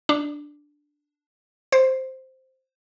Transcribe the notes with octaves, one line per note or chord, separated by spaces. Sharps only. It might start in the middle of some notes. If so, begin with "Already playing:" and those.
D4
C5